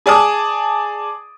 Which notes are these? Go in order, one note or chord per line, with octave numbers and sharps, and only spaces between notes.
G#4 D5 A5 D#6